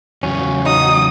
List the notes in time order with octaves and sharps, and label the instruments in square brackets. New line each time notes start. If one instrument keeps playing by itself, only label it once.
[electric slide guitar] E2 C#3 [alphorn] F#3 [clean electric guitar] C#4
[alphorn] F#3 [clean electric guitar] D#4 [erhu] D#6